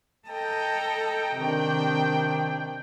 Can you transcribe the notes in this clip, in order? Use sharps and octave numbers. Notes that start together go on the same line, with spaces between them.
A4 D#5 G5 A#5
C3 D#3 D4